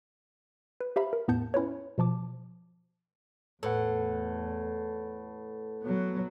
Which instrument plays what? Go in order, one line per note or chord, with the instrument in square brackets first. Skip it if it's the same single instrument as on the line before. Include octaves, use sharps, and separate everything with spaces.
[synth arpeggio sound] B4
G4 C5 E5 F5 A#5 B5
A#4
E2 A2 B3 A5 G6 C#7
C#4 E4 B4 C#5
B2 F3 A5 D6
[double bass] E2 [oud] A2 [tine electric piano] A4 B4 F#5
[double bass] F#3 B3